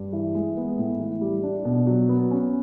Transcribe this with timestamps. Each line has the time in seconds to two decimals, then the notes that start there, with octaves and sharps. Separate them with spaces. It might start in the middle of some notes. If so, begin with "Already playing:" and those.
Already playing: G2
0.13 E3
0.35 G#3
0.57 B3
0.78 A2
1.00 E3
1.21 G3
1.43 D4
1.65 B2
1.87 F#3
2.09 B3
2.31 C#4